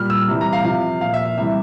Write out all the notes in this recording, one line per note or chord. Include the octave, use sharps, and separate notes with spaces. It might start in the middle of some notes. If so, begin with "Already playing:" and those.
Already playing: A#2 G3 F6
E6
C3 E3 G3
A#5
F5
C3 F3 F5
A#2 F3 F5
E5
E5
C3 E3 G3 E5